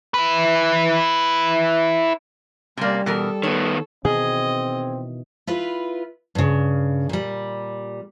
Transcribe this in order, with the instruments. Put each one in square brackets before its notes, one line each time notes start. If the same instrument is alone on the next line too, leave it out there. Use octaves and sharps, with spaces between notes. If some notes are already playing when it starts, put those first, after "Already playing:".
[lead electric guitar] E4 B4
[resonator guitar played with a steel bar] C3 A#3 [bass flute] G3 [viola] C#4 D5
[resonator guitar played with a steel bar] B2 E3 A#4 [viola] A4
[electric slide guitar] D#3 B3 [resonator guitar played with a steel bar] C#5
[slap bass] B2 D#3 E3 [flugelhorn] C4 [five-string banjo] G#4 [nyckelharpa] D#5
[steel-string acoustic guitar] E4 F4 B4
G2 C#3
A#2 G3